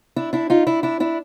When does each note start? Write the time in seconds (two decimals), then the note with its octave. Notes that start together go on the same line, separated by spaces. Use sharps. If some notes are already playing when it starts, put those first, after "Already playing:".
0.16 D4 E4
0.33 D4 E4
0.50 D#4 F4
0.67 D4 E4
0.83 D4 E4
1.00 D4 E4